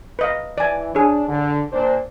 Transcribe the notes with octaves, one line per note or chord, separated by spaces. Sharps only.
B4 D#5 F5
E3 D5 G#5
D4 G#4 C#5
D3
A#2 D4 C5